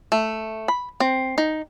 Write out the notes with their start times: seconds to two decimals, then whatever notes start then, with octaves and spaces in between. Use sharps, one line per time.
0.12 A3
0.68 B5
1.00 C4
1.38 D#4